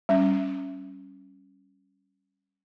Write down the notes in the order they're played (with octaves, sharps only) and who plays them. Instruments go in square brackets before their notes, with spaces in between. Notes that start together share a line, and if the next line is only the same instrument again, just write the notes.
[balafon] G3 C#4